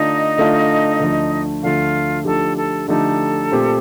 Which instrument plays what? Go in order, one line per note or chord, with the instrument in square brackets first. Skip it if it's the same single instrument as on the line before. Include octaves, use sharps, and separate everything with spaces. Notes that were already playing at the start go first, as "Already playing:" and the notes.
Already playing: [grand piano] D3 A3 D4 F4 [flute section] D#4 D#5
[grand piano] D3 A3 D4 F4
D2 D3 F3 A3
[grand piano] D2 D3 F3 A3 [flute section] F4 F5
[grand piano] D3 F3 A3 D#4 G4 [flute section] A4
[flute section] A4
[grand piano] D3 F3 A3 D#4 G4 [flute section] A4
[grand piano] A#2 A3 C4 G4